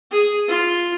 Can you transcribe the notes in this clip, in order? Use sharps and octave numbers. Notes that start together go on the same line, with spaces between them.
G#4
F4